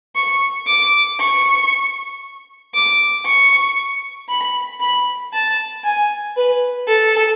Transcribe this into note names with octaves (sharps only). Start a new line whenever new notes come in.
C#6
D6
C#6
D6
C#6
B5
B5
A5
G#5
B4
A4